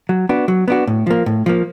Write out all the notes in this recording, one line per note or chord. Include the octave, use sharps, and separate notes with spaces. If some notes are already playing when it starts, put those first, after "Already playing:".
F#3
B3 D4 F#4
F#3
B3 D4 F#4
A2
F3 A#3
A2
F3 A#3